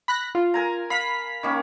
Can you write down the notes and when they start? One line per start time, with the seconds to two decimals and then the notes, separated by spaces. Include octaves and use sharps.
0.08 B5 F#6 A#6
0.35 F4
0.54 A#4 G#5 A#5
0.90 F5 B5 B6
1.43 D#3 A#3 C#4